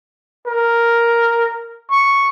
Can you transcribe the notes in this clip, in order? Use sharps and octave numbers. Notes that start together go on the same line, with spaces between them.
A#4
C#6